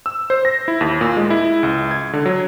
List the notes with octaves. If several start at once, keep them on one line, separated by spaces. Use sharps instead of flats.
E6
C5
A#6
E4
D#2
A#2
G#3
E4
C#2
G#6
D3
F#3